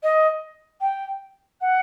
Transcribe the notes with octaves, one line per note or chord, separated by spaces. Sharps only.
D#5
G5
F#5